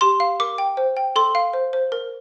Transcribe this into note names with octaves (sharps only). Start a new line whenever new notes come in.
G4 C6
F5
A#4 D6
G5
C5
G5
A4 C6
F5
C5
C5
A#4